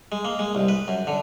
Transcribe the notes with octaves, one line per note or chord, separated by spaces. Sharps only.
G#3
A#3
G#3
C2
B4
F#2
D3